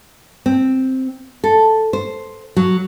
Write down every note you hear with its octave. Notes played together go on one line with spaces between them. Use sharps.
C4
A4
C5
F#3